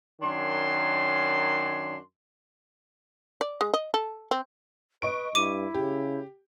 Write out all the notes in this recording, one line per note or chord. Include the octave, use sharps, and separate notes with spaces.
F#2 D#3 D4 C#5 C6
D5
G#3
D#5
A4
C4
B4 D#5 C#6 D7
G2 E4 D6 D#7
C#3 G4